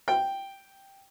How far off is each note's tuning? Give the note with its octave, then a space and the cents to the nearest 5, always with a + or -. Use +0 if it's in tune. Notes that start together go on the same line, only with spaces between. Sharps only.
G5 +0